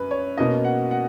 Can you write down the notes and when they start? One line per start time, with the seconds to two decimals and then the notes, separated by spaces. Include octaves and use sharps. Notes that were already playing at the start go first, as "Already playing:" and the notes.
Already playing: F#2 B4
0.11 C#5
0.38 B2 A#3 C#4 D#5
0.64 F#5
0.91 F#5